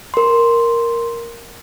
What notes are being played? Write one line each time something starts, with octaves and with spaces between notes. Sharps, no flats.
A#4 C6